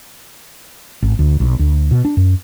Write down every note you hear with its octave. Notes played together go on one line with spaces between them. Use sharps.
G#1
D2
B1
D2
B2
D4
F#2